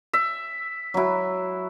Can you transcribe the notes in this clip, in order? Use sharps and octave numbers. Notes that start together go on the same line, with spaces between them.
E5
F#3 E4